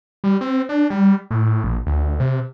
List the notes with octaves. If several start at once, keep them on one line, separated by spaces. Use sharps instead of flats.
G3
C4
D4
G3
A2
A#1
D2
C3